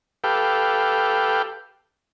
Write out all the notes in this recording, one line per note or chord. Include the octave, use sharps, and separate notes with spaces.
G4 A4 B4 F5 G5